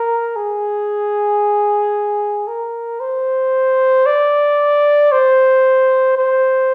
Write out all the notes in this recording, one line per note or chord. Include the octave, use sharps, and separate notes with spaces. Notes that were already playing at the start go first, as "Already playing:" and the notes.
Already playing: A#4
G#4
A#4
C5
D5
C5
C5